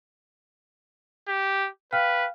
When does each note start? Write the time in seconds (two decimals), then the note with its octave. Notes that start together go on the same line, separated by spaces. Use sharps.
1.28 G4
1.93 B4 F5 G5 F6